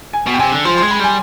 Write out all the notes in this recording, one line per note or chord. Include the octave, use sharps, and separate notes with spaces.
G#5
B2
G5
C3 G#5
D3
F3 C6
G#3 C6
B5
G3 G#5